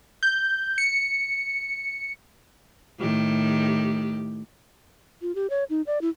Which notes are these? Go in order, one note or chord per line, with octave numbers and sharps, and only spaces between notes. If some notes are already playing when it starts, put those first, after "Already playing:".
G6
C#7
A2 D#3 G4
F4
G4
C#5
D#4
D5
E4